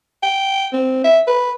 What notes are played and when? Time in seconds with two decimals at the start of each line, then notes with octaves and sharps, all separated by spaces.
0.23 G5
0.73 C4
1.04 E5
1.27 B4